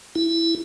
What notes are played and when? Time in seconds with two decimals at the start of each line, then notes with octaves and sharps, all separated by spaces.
0.15 E4